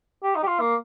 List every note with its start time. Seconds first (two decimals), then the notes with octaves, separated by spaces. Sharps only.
0.23 G4
0.36 D#4
0.43 G4
0.47 F4
0.60 A#3